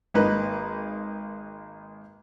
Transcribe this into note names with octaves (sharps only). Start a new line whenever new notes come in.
G#1 A#3 D#4 B4